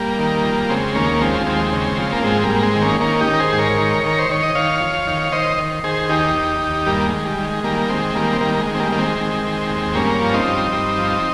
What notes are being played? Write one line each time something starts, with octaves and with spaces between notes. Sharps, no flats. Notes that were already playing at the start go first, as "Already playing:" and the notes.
Already playing: G3 A#3
D#3
F2
C#3 G#3 C4
D#2 A#3 C#4
F3 G#3 C4
D#2 G#3 C4
C#3
F3 G#3
A#3
G#2 G#3 C4
G3 A#3
G#2
G#3 C4
D#3
A#3 C#4
D#3 A#3 C#4
D#4 G4
D#3
A#4
G#4 C5
G#2
A#4 C#5
D#3
D#3 A#4
C5
D#3 C#5
D#5
D#3 C#5 F5
F2
D#3
F5
D#3 C5 D#5
D#3
D#3 G#4 C5
D#2 D#4 G4
D#2
D#2
G2 G3 A#3
G#3
D#3
G3
D#3
G#3
D#3 G3 A#3
D#3 G#3 C4
D#3 G3 A#3
C4
D#3 G3 A#3
A#3
G#3
D#3
C4
G3 A#3
D#3 A#3
G#3 C4
D#3
D#3
D#2
G2 A#3 C#4
F3
C4 D#4
G2
G2
F3